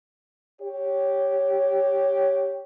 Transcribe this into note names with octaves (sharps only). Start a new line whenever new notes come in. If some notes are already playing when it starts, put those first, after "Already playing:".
G4 C#5